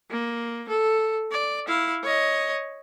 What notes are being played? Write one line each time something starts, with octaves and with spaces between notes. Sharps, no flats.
A#3
A4
D5
E4 F5
C#5 D#5